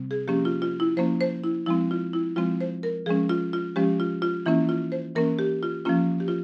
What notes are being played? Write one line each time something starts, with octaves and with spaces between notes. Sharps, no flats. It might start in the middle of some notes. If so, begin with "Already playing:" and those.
Already playing: C3 G3 C4
G#4
F3 A#3 C#4 G4
F4
F4
E4
F3 A#3 C#4 C5
C5
E4
F3 G#3 C4 E4
F4
E4
F3 G#3 C4 F4
C5
A#4
F3 G#3 C#4 G#4
F4
F4
F3 G#3 C#4 G4
F4
F4
E3 A#3 C#4 E4
F4
C5
E3 A#3 C#4 A#4
G4
F4
F3 A#3 C#4 F4
G4
F4